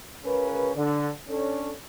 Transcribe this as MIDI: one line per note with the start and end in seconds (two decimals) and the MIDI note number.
0.24 0.70 37
0.24 0.70 49
0.24 0.70 61
0.24 0.70 70
0.24 0.70 71
0.75 1.08 50
1.28 1.71 61
1.28 1.71 62
1.28 1.71 69